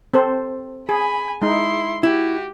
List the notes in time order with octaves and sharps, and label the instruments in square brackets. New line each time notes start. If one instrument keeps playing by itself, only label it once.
[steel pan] C4 A4 C5
[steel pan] G#4 [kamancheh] G#5 B5
[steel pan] G#3 D#4 [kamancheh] E4 C6
[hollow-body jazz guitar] E4 [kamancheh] F#4 G4